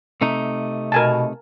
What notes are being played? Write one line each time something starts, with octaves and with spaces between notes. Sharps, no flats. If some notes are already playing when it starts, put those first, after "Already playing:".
C3 A3 D#4
B2 A#4 G#5 A5